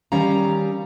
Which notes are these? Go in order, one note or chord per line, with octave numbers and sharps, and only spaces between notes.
D#3 G3 C#4 F5 A#5